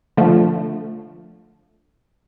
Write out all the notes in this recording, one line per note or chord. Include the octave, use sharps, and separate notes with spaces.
D3 F3 A3